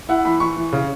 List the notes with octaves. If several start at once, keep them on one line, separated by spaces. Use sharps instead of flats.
E4 F#5
E3 B5
E3 C#6
E3
C#3